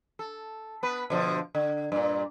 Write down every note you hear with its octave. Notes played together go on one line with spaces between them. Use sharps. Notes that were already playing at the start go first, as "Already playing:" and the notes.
A4
B3 B4
B2 D3 F3
D3
G2 A#2